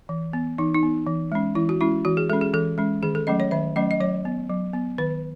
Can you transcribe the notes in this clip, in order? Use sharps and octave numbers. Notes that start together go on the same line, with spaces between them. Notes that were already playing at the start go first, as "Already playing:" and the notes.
E3
B3
E3 D#4
D#4
B3
E3
G#3 C#4
E3 E4
F#4
G#3 C#4 E4
E3 F#4
G#4
G#3 C#4 A4
G#4
E3 A4
G#3 C#4
D#3 G#4
A4
F#3 A3 C#4 D#5
C#5
D#3 E5
F#3 A3 C#4 D#5
D#5
F#3 C#5
B3
F#3
B3
D#3 B4